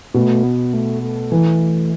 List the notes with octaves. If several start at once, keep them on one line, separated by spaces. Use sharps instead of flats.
B2 A3
B3
A3
A3
E3